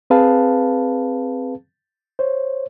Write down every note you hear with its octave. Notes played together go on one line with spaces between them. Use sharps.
C4 G#4 B4 F5 A5
C5 C#5